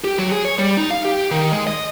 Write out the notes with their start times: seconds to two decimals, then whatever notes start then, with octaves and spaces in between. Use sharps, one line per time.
0.04 G4
0.19 F#3
0.32 G#4
0.45 C#5
0.58 G3
0.77 D#4
0.91 F5
1.05 G4
1.31 D#3
1.52 G#3
1.67 D#5